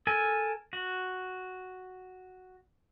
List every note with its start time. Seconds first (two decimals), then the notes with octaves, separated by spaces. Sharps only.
0.07 A4 A#4 G#5
0.73 F#4